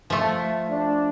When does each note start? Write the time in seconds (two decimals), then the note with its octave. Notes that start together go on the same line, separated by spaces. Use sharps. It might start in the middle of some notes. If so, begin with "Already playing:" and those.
0.10 F3 A3
0.70 D4